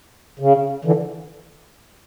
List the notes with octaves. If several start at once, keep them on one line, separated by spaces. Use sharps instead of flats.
C#3
D3 E3